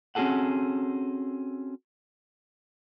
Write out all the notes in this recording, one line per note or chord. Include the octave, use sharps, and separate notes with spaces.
C4 C#4 F#4 G#4 A4 F#5